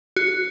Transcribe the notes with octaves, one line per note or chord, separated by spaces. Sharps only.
F#4